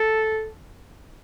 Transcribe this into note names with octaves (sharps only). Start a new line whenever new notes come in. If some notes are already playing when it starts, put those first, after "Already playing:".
Already playing: A4